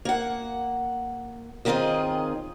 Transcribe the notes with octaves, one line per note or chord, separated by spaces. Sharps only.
A#3 F#5
D#2 D#3 C4 F4 G#4 D#5